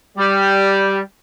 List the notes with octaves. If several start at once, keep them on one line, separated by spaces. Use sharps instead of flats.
G3